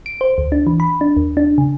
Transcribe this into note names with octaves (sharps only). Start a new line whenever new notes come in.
D7
C5
D2
D4
E3
B5
D4
D#2
D4
C#3